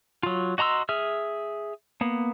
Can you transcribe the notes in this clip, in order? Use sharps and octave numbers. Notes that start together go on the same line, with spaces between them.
F#3 F4
F#4 D#5 A#5 C6 E6
G#4 E5 F6
A#3 B3